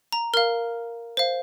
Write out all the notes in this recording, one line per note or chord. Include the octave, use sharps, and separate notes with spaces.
A#5
A#4 F5 F6
C5 F5